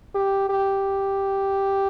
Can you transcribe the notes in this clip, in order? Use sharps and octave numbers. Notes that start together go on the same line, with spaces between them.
G4
G4